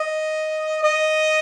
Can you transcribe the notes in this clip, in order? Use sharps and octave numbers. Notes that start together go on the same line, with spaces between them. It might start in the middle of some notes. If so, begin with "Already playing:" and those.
Already playing: D#5
D#5